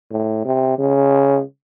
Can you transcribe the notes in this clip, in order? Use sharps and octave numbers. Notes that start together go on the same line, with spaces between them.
A2
C3
C#3